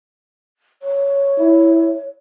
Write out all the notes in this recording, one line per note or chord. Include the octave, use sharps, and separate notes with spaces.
C#5
E4